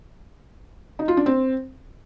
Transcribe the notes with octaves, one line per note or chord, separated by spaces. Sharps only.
D#4
F4
D4
C4